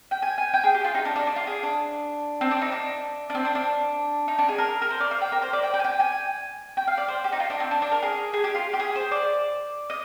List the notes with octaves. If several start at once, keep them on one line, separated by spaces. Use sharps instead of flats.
G5
G#5
G#5
G5
G#4
G4
F4
D#4
D4
D4
D4
F4
G#4
D4
C4
D4
D#4
D4
D4
C4
D4
D4
D#4
D4
G#4
A#4
A#4
C5
D5
F5
G5
A#4
C5
D5
G5
G5
G#5
G5
G#5
G5
F5
D5
C5
G4
D#4
F4
D4
C4
D4
D4
A#4
G#4
G#4
G4
F4
G4
G#4
C5
D5
D#5